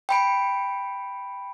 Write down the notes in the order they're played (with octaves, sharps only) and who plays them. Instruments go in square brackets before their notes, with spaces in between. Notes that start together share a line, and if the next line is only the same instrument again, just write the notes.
[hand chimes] G5 B5 D7